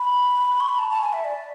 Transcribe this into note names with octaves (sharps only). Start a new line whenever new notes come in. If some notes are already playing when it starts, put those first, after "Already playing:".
Already playing: B5
C#6
B5
A5
A5
G#5
E5
D5